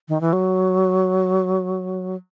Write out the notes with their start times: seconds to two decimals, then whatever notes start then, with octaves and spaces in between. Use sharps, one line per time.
0.09 D#3
0.21 E3
0.33 F#3